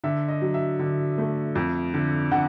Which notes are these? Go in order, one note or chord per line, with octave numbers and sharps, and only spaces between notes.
D3 E5
D#5
F#3
E5
D3
A3
F2
D3
D3 F#5